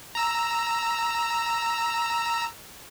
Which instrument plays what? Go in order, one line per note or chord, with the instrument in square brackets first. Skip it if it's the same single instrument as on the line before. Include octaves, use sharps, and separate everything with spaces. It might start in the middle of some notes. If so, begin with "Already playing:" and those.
[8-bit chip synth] A#5 E6